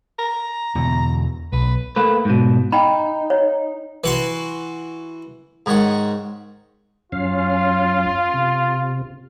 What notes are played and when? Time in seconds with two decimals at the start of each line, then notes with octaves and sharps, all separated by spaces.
0.19 A#5
0.75 E2 B2 D3
1.52 B1 B4
1.96 A3 A#3 B4
2.25 G#2 B2
2.72 D#4 G5 B5
3.30 C#5
4.04 E3 F#4 C6
5.66 G#2 D#3 C#5 F#5 C#6
7.12 F#2 C#4 F4 F5
8.34 C3